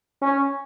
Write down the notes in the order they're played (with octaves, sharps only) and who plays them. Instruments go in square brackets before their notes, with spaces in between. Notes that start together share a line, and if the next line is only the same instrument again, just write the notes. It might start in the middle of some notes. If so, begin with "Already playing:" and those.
[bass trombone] C#4